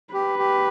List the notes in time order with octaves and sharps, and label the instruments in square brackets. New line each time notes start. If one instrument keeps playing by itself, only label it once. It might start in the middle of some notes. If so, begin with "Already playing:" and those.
[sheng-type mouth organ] G4 [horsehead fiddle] B4
[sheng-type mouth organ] G4